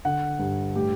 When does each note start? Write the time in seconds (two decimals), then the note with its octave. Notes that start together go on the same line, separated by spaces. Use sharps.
0.05 D3 F#5
0.39 G2
0.76 A2 G4